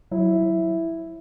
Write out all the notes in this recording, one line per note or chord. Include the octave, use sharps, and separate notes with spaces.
F#3 E4